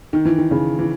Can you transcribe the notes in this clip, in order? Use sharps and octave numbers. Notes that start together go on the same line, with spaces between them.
D#3
E3
D#3
C#3
E3